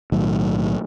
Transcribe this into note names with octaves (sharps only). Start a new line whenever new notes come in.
B1 A2 D#3 F#3